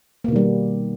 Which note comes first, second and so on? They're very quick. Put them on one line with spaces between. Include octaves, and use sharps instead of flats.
A#3 B2 D#3 G3